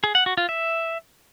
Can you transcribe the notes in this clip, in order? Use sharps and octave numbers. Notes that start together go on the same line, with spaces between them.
G#4
F#5
F#4
F4
E5